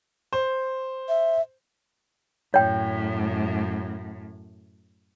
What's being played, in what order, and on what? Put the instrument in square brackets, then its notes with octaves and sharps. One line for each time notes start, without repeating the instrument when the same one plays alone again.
[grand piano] C5
[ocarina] E5
[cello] F#2 A2 [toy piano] C#5 G5